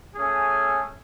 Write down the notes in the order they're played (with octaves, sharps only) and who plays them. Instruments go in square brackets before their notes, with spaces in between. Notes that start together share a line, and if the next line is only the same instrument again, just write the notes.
[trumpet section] A3 C#4 G#4